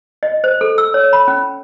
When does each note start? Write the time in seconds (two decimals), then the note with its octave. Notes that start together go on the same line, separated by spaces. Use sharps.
0.23 D#5
0.44 C5
0.61 A4
0.78 E6
0.94 C#5
1.13 B5
1.28 C#4